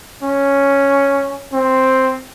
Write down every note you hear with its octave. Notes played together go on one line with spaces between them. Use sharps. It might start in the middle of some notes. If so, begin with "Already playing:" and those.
C#4
C4